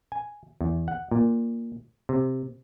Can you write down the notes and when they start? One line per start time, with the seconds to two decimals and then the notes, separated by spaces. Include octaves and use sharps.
0.12 G#5
0.61 E2
0.88 F#5
1.11 A#2
2.09 C3